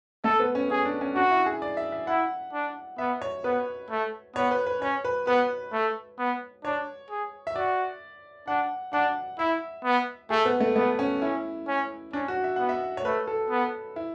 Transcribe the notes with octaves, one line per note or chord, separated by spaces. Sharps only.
A3 A4
B3
C#4
C#4 G#4
D4
C#4
D4 F#4
E4
G#4
D5
E5
E5
E4 F#5
D4
B3 E5
C#5
B3 B4
A3
B3 C#5
B4
B4
C#4 C#5
B4
B3 B4
A3
B3
D4 C#5
G#4
E5
F#4 D5
D4 F#5
D4 F#5
E4 E5
B3
A3 G#4
B3
A3
A3 B3
C#4
C#4 E4
C#4
C#4 D4
F#4
E5
B3 F#5
E5
C#5
A3 B4
A4
B3
E4